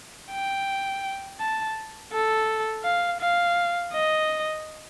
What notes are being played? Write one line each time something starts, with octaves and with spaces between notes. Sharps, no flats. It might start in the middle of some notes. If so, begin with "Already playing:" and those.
G5
A5
A4
F5
F5
D#5